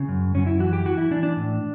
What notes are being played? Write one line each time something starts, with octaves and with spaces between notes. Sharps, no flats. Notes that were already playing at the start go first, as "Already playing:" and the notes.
Already playing: C#3
F#2
F#2 C#4
E4
E3 F#4
G4
E3 F#4
E4
E3 D4
D4
A2